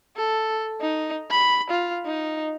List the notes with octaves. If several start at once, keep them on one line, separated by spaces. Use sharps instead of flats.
A4
D#4
B5
F4
D#4